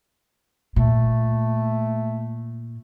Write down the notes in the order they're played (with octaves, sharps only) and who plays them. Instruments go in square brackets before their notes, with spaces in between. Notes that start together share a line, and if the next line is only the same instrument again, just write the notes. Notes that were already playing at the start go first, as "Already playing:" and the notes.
[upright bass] A#2 [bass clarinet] A3